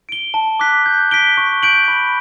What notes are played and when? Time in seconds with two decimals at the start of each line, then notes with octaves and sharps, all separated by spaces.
0.09 D7 G7
0.34 A5
0.60 D6 F#6 B6
0.86 G6
1.11 B6 D7 G7
1.37 C#6
1.63 G6 D7 F#7
1.88 B5